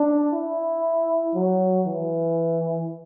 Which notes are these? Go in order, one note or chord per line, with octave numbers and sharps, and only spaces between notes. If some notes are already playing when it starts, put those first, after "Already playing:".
Already playing: D4
E4
F#3
E3